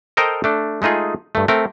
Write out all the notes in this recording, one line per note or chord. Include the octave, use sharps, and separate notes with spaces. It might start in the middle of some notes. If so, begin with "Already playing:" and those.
A4 A#4 C5 D#5 G5 A#5
A3 D4
G#3 A3 D#4 F4 G#4
G2 A3
A3 C4 A#4